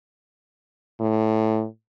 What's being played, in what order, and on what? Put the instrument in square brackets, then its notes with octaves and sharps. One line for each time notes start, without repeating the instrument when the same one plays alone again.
[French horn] A2